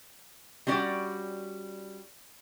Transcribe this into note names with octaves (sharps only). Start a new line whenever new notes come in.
G3 C#4 F#4 D5